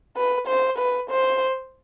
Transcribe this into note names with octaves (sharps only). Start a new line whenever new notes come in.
B4
C5
B4
C5